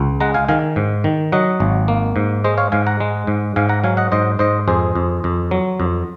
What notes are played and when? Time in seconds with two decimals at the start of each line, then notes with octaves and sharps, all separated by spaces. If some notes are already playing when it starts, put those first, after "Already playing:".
Already playing: C#2
0.20 G#3 F#5 A#5
0.34 F5 G#5
0.48 D#3 F5 G#5
0.76 G#2
1.04 D#3
1.32 F#3 D#5 F#5
1.60 G#1
1.88 A#3
2.16 G#2
2.44 G#3 C5 D#5
2.58 C#5 F5
2.72 G#2 F5 G#5
2.87 F#5 A#5
3.00 G#3
3.27 G#2
3.56 G#2 F5 G#5
3.69 F#5 A#5
3.84 F#3 F5 G#5
3.97 D#5 F#5
4.12 G#2 C5 D#5
4.39 G#2 C5 D#5
4.68 F2 G#4 C5
4.95 F2
5.24 F2
5.51 F#3
5.80 F2